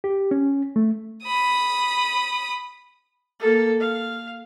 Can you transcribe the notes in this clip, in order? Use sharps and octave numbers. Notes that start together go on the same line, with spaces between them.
G4
C#4
A3
B5 D#6
A#3 A4
F5